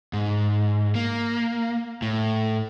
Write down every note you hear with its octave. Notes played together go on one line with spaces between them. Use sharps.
G#2
A#3
A2